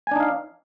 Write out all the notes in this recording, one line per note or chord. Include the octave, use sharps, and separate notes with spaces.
D4 D#4 F5 G#5